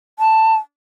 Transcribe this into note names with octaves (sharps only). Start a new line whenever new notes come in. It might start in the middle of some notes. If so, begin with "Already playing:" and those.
A5